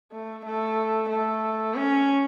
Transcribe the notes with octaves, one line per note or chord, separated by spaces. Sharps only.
A3
A3
A3
C#4